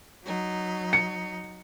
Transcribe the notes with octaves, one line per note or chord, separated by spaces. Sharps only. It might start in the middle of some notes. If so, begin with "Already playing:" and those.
F#3 D#4
C#7